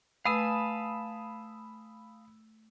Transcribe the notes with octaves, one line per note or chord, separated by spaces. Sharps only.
A3 B4 F5 G#5 A5 B5 D#6 E6